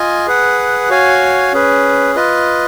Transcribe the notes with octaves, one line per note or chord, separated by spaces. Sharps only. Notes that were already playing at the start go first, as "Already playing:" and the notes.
Already playing: F4 D#5 G#5
G#4 B4 F#5
F#4 C#5 F5 G#5
C#4 G#4 B4
F4 B4 D#5